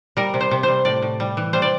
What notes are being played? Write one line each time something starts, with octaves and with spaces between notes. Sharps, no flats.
G3 A#4
C3
C5
C3
G3 C5
A2 D5
A2
G3
E3
G3 C5
D5